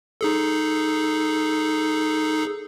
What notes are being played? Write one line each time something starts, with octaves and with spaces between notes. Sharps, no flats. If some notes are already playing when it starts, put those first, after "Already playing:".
D#4 G#4 A4